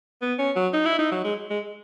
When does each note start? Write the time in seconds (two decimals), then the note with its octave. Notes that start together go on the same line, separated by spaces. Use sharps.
0.22 B3
0.39 C#4
0.56 F#3
0.74 D#4
0.86 E4
0.99 D#4
1.12 F#3
1.25 G#3
1.50 G#3